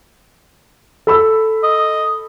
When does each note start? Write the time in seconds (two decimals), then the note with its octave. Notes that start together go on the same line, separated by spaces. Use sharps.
1.07 A4 B5 E6
1.63 D#5